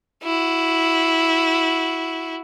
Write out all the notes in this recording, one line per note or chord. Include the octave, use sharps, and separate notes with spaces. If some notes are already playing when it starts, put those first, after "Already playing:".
E4 F#4